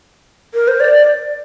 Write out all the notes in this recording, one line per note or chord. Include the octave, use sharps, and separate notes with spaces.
A#4
C5
D5